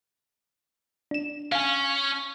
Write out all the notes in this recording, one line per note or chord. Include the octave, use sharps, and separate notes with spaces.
D4 E7
C#4 F5 G#5